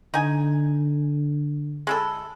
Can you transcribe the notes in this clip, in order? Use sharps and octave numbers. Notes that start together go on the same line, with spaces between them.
D3 D#4 G#5
G#3 E4 A4